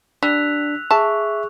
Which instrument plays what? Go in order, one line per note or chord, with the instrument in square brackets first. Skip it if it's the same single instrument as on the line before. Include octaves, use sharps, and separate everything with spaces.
[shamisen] G3 [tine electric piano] D4 [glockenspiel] E6 F#6 F7 [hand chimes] B6
[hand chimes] G#4 C#6 [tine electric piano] E5 [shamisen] A5